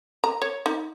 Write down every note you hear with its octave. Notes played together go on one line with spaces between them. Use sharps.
A#5
C#5
D#4